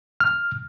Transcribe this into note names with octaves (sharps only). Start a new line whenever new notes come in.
F6